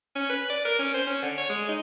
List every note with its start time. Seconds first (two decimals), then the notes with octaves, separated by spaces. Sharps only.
0.16 C#4
0.30 B4
0.50 D5
0.65 A#4
0.79 C#4
0.94 C5
1.07 C#4
1.23 D3
1.38 C#5
1.50 G#3
1.69 D#4